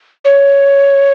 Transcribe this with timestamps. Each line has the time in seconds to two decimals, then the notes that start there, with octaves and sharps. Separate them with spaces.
0.25 C#5